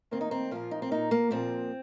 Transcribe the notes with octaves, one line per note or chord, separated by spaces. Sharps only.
D#3 A#3 C4
D#4
C4
A#2 F3 A#3 F4
D#4
C4
A#2 A#3 D#4
A#3
A#2 F3 A#3 C4